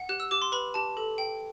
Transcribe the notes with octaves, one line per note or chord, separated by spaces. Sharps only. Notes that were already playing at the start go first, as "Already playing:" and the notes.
Already playing: F#5
G4 F#6
E6
G4 D6
C6
B4 B5
G4 A5
A4
G5